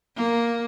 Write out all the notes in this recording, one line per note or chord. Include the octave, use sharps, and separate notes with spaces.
A#3